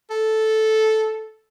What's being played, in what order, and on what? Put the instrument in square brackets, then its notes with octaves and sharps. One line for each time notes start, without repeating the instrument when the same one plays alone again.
[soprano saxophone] A4